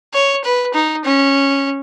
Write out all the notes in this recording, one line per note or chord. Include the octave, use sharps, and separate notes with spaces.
C#5
B4
D#4
C#4